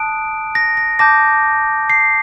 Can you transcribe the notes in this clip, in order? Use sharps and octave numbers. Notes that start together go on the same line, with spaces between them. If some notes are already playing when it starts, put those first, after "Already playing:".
Already playing: A5 D#6 F#6 D7
A#6
A#6
A5 D6 G6 A#6
C7